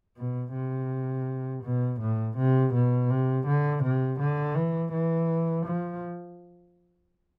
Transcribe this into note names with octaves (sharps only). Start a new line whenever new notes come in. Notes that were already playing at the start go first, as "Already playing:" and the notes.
B2
C3
B2
A2
C3
B2
C3
D3
C3
D3
E3
E3
F3